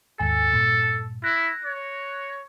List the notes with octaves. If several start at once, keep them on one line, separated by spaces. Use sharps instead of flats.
D#2 G#2 A4 G#5
G2 A#2
E4 F#6 A#6
C#5